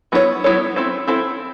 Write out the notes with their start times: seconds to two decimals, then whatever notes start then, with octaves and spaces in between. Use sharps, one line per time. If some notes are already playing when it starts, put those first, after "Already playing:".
0.12 F#3 B3 E4 A4 C#5
0.44 F#3 B3 E4 A4 C#5
0.76 C4 E4 A4 C5
1.08 C4 E4 A4 C5